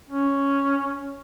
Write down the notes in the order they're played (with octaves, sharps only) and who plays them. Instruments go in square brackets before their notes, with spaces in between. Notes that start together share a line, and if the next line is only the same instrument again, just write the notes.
[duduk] C#4